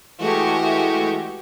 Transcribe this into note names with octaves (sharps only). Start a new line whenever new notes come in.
E3 G#3 A3 F#4 G4 C#6